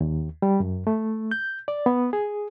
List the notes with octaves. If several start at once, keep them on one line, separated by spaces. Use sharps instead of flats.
D#2
G3
F#2
A3
G6
D5
B3
G#4